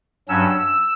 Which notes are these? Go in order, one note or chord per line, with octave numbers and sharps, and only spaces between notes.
G2 F#3 C#4 E6